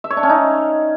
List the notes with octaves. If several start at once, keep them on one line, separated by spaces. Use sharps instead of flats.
E5
C#5
D4
C#4
D#4